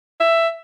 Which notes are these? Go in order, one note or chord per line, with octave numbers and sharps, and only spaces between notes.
E5